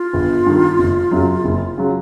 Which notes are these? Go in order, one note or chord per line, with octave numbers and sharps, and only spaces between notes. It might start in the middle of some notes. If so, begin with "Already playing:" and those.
Already playing: F4
G1
G2 D#3
F#1
F#2 C#3 F#3
F#1
C#3 F#3